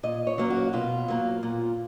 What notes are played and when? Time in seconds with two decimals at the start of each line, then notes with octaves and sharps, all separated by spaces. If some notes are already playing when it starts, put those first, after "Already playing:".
0.03 A#2 D#5
0.27 C#5
0.38 F#3 A#3 C#4
0.50 F#4
0.73 B2 F4
1.08 F#3 A#3
1.43 A#2